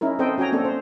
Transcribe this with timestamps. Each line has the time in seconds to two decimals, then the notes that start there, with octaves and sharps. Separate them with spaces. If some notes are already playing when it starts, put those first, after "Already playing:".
0.01 C#4 D#4 E4 A#4
0.19 C4 A4 C5 D#5 G5
0.38 C#4 F#4 G5 G#5 A#5
0.52 A#3 C4 D4 A4
0.65 C5